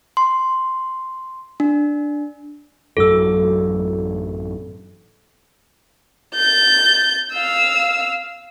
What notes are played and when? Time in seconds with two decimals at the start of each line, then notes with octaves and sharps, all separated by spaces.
0.17 C6
1.60 D4
2.97 A1 F#2 F#3 A4 E6
6.34 G6 A6
7.33 F5 E6